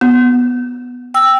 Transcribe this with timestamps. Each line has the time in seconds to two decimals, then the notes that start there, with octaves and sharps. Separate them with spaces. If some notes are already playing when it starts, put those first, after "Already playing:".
0.01 B3
1.14 G5 E6